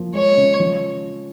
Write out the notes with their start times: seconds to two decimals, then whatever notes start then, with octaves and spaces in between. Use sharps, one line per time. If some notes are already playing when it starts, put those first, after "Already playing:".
Already playing: F3 A#3
0.13 G#3 C#5
0.37 C#3
0.60 F3